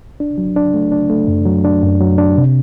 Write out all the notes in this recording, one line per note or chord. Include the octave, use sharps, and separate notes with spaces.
D4
F#3
D4
A3
D4
A3
F#2
F#3
D4
F#2
F#3
D4
C3